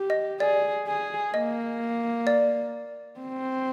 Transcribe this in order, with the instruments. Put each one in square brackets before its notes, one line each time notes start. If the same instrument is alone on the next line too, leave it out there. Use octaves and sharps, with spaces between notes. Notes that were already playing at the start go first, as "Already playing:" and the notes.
Already playing: [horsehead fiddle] G4
[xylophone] D#5
[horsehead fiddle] G#4 [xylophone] D5
[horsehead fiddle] G#4
[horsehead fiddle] A#3 [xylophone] D#5
[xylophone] D5
[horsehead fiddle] C4